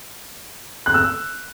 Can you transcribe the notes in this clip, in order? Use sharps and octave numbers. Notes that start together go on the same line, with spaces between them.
F#6
E6